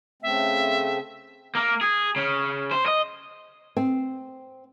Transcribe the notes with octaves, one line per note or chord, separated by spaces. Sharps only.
C#3 A3 C4 E5
A#3
G#4
C#3
C5
D#5
C4